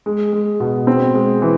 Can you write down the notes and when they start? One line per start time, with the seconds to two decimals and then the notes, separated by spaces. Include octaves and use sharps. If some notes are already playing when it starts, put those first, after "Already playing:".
0.06 G#3
0.33 G#3
0.60 B2
0.87 C4
1.14 G#3
1.42 E3